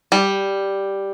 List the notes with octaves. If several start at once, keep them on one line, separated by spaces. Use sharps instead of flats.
G3